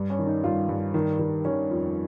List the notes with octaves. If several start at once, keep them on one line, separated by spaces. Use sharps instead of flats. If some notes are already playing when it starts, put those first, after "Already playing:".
Already playing: G2
C#4
D#3
D#4
G2 F4
G2
D#3
D#3
D#3 C#4
F2